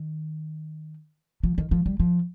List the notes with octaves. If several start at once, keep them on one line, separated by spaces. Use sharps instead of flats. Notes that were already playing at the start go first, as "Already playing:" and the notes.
Already playing: D#3
F3
D#3
F3
G3
F3